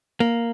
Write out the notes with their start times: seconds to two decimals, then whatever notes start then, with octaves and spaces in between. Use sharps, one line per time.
0.20 A#3